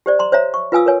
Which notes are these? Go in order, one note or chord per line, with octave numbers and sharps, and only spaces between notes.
G4 C5 D5
A#5 C6
C5 C#5 E5 A#5
C#6
F4 B4 F5 G#5 D#6 E6
A#4 B4 C#5 G#5